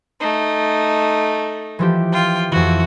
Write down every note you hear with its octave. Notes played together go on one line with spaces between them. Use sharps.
A3 D#4
E3 F3 G4
F4 G5
F2 E3 F#4